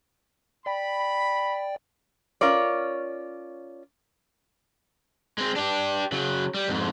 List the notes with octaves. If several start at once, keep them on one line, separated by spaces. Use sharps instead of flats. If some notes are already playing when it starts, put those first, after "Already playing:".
D5 G5 B5
C#4 F4 A#4 C#5 D5
G#3 C4
D4 G4
C#3 F#3
G3
F2 G#2